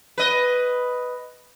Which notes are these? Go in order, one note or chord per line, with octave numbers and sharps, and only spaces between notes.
B4 D#5